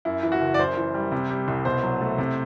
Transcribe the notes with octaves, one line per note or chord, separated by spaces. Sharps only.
F#2 E4
E3
F#4
F#1
D5
F#2 C5
E3
G3
C3
G3
C2
B2 C5
F#3
A3
C3